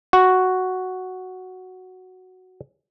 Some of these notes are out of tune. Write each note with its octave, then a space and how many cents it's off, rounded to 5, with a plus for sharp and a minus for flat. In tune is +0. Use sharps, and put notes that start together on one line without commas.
F#4 +0